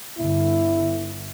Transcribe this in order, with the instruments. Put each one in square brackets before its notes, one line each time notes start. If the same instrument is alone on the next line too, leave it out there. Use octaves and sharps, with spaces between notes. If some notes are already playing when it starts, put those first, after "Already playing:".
[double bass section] G1 D3 [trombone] E4